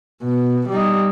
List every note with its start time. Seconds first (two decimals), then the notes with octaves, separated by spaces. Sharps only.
0.23 B2
0.69 G3 D#4